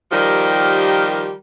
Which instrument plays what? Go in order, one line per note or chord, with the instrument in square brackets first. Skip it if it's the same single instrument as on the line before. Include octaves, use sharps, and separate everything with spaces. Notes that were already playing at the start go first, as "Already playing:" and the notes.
[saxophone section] D#3 F3 G3 G4 A#4